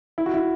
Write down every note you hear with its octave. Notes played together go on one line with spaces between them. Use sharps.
E4
F#4
E4